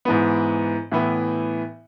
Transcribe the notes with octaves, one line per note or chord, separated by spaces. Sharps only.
G#2 E3 B3
A2 E3 B3 E4